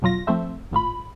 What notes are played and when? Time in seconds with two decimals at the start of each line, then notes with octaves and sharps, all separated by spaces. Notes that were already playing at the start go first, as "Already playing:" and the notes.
0.02 F2 B2 F#3 F4 A#6
0.27 F3 A3 C4 A4 C5 E5
0.71 G#1 A2 F4 B5